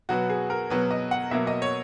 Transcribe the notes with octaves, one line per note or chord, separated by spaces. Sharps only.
B2 F#3 B3 F#4
G#4
A#4
B2 F#3 B3 B4
D#5
F#5
B2 F#3 A#3 E5
D#5
C#5